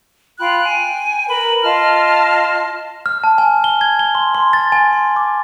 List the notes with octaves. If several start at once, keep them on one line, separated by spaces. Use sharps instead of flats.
F4 G5 B5 F#6
G5 G#5
A#4 B4 B5
F4 D#5 A5 F6
F6
A5
G#5
G7
G#6
G7
C6
C6
A6
G#5
C6
D6